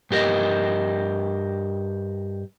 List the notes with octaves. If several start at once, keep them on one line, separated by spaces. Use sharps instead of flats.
G2 G4 A#4 D#5